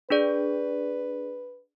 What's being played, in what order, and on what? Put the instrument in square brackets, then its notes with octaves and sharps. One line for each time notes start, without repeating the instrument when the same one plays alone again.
[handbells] D4 G#4 D5 [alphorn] B4